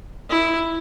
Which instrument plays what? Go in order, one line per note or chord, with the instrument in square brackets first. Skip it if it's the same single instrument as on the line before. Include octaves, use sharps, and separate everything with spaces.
[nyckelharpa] E4